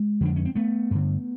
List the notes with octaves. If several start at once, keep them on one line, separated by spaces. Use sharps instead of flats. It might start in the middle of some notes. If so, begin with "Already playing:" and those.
Already playing: G#3
F2 D3 D4
C#4
C4
A3 B3
G2 D3